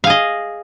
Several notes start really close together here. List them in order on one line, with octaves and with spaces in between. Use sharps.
F5 G#4 D#5